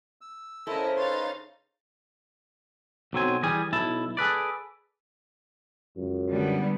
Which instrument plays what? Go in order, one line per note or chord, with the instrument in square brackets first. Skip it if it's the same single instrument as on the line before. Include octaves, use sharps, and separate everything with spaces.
[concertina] E6
[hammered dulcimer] C#3 C5 [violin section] E4 A#4 D#5 [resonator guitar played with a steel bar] A4
[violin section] D#4 F5 A6 [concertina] B4 C#5 C6
[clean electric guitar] B1 F#3 C4 G#5
E3 G3 G#4 G#5
B1 E4 A5
G#4 A4 B4 D5
[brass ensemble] C#2 F#2
[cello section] D3 G3 B3